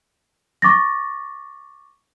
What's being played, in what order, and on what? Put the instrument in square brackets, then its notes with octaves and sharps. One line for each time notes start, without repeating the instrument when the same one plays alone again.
[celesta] C#6 D6 A6 A#6